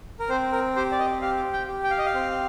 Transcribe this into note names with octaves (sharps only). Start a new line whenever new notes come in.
A#4
C4 C5
A#4
G4 C5
D5
D#5
G4 F5
G5
G4
G5
F5
D#5
F5
C4